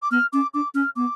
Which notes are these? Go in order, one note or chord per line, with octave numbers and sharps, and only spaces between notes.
D6
B3 F6
C#4 D6
D4 D6
C#4 F6
B3 D6